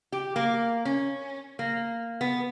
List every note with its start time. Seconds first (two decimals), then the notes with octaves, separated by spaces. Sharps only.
0.12 G4
0.36 A#3
0.85 C#4
1.59 A#3
2.21 B3